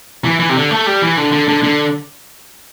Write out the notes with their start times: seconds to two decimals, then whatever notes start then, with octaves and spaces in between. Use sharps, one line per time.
0.25 E3
0.40 E3
0.49 C3
0.55 D3
0.71 A3
0.87 G3
1.02 E3
1.17 D3
1.33 D3
1.48 D3
1.63 D3